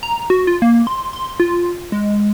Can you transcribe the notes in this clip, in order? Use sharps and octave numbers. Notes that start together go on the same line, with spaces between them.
A#5
F#4
F4
A#3
C6
C6
F4
G#3